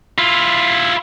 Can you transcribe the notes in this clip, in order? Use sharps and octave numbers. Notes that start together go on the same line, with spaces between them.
E4 F4